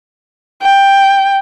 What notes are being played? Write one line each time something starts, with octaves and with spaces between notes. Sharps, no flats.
G5